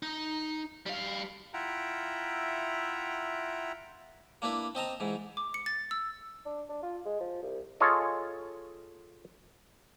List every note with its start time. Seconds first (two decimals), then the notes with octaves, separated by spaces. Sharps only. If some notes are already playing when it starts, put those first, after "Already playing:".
0.03 D#4
0.86 G3 F5
1.54 E4 F4 E5 F#5 G5 A#5
4.42 A#3 D4 E4 B4
4.75 C4 D#5 A5 A#5
5.00 G#2 E3
5.37 D6
5.54 C#7
5.66 A6
5.91 E6
6.45 D4
6.69 D4
6.83 F4
7.05 G#3
7.20 F3
7.42 C2
7.80 F4 G#4 A4 C#5 D#5